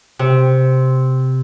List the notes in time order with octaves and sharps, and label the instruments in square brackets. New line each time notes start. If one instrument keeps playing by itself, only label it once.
[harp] C3